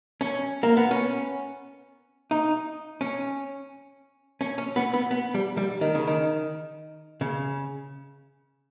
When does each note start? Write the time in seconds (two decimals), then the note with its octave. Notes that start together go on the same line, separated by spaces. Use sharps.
0.21 C#4
0.63 A#3
0.77 B3
0.91 C#4
2.31 D#4
3.01 C#4
4.41 C#4
4.58 C#4
4.76 B3
4.94 B3
5.11 B3
5.34 G3
5.57 G3
5.81 D#3
5.95 C#3
6.07 D#3
7.21 C#3